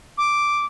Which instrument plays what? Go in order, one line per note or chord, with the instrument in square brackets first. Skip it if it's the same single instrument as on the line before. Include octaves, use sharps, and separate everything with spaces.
[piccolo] D6